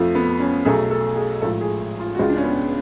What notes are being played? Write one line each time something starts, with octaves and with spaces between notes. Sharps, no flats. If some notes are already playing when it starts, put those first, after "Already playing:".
Already playing: F2 F3 A3
B3
C#4
B1 B2 F#3 A3 G#4
A4
G#4
A1 G#2 F3 A4
G#4
F4
F#4
C#2 C#3 G#3 F4
D4
C#4
B3